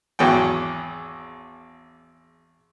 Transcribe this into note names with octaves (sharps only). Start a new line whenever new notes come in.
G#1 E2 F#3 G5